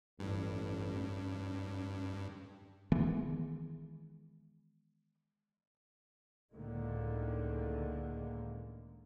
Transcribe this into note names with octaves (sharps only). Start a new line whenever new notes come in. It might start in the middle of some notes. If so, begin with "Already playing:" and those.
A1 G2
C#4
D#3 E3 G#3 B3
C#2 A2 D3 D#3 G#3 A#3